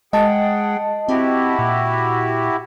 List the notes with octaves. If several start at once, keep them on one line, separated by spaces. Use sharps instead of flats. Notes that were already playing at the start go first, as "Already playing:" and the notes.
G#3 G#4 D#5 F#5 G5 A5
C4 E4 F#4 G4
A#2